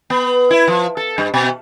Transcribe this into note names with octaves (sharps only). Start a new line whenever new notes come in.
B3
E4
F3
A4
G2
B2